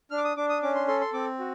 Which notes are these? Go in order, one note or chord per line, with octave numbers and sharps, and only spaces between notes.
D4 F6
D6
D#6
D4 D6
D#6
C#4 D6
C6
A4 C6
C6
C4 D6
F#4